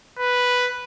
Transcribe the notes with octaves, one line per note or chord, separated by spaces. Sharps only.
B4